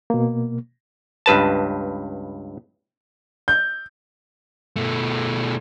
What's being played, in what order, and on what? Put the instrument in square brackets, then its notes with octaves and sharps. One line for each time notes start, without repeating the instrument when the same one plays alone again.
[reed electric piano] B2 A#3
[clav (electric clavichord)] C#2 G2 B4 A5
[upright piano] G6
[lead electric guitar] B2 A3